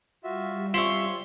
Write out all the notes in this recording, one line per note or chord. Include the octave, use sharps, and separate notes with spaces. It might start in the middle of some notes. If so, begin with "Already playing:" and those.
G3 F4 F#4 E5
C4 C#4 F4 C#5 E5 C6 E6